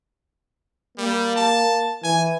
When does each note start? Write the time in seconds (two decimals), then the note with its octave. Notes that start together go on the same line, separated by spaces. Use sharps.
0.98 G3 A#3
1.36 A5
2.04 E3 G#5